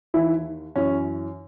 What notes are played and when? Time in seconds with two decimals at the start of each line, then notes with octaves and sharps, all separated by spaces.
0.14 D#2 D#3 E3 E4
0.76 F#2 E3 C#4